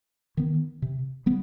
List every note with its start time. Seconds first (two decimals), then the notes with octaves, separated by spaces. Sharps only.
0.37 D#3 B3
0.82 C3
1.26 G3 B3